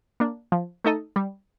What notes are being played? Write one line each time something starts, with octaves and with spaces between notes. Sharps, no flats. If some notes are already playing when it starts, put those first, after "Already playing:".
A#3 D4
F3
A3 D#4 A4 D#5
G3